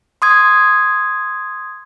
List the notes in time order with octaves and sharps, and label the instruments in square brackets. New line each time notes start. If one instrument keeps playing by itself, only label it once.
[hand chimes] C6 D#6 G#6